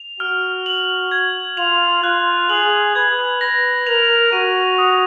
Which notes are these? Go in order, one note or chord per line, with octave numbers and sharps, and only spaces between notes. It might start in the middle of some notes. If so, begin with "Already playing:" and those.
Already playing: F7
F#4 F6
F#7
G#6
F4 F7
F4 F#6
G#4 F#7
B4 G#6
B4 A#6
A#4 F7
F#4 D#7
D#6